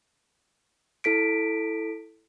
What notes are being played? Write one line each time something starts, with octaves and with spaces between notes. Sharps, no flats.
E4 A4 B6 D7